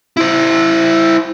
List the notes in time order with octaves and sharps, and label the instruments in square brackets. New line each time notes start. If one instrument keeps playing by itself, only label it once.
[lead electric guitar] E4 C5